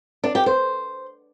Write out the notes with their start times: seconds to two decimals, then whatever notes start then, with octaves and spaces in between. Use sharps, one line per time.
0.24 D4
0.35 G4
0.46 C5